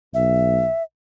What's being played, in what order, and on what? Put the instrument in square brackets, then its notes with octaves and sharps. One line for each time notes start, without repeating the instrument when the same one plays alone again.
[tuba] B1 [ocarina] E5